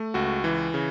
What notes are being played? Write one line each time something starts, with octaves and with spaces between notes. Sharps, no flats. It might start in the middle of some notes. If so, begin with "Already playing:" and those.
Already playing: A3
C#2 F#4
E3
C#3